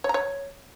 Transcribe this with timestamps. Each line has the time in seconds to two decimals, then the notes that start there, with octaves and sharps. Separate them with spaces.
0.04 C#5
0.09 A#5
0.14 C#5